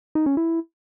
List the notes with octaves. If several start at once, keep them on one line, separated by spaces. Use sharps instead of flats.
D#4
C#4
E4